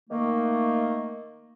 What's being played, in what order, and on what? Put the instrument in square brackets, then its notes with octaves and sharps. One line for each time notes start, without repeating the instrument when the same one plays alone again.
[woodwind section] D#3 A3 A#3